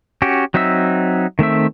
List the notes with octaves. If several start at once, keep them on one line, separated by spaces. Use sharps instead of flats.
C#4 F#4 G4
F#3 C4 D#4 E5 E6
D#3 A3 C4 E5